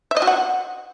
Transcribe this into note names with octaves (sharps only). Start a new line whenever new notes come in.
E5
D#5
F#4
F#5